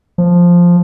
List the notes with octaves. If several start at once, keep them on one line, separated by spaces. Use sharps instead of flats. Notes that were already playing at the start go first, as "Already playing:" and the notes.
F3